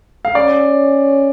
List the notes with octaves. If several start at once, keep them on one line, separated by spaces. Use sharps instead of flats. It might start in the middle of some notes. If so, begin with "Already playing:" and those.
F5
C#4 D5